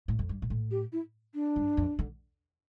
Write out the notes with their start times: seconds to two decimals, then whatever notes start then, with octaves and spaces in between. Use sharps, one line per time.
0.08 A2
0.19 F2
0.29 G2
0.42 A#2
0.50 A2
0.71 G4
0.93 E4
1.35 D4
1.56 G2
1.77 F2
1.99 D3